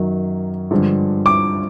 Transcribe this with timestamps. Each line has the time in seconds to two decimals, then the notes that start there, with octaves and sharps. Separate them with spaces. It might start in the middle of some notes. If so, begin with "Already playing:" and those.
Already playing: F#2 D#3 F#3
0.71 G2 D3 F3 G#3
1.26 D6